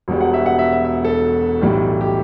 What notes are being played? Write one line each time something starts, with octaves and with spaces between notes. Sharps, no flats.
E1 E2 B2 G3
F#5
E5
F#5
E5
E5
E5
A4
B1 A2 E3 G3
G4